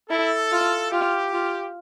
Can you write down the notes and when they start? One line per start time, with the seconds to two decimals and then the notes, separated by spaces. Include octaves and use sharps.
0.10 E4 A4
0.52 F4
0.92 F4 G4
1.34 F4